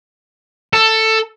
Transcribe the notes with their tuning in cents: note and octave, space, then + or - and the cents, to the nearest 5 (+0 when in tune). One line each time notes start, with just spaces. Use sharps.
A4 +10